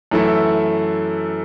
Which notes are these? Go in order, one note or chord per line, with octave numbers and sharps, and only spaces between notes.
F#2 E3 A3 E4 A4